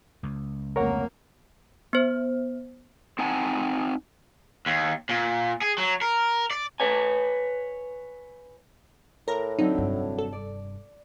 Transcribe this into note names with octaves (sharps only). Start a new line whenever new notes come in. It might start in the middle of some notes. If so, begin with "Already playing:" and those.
C#2
F1 A#3 A#4 C#5 F#5
B3 C5
C4 D#4 F#5 G#5 A5
D#2
A#2
G#4
F#3
A#4
D5
B4 C#5 G#5
A2 A#4 A#5
D3 F#3 C4 D#4
F1 G2
A4
D5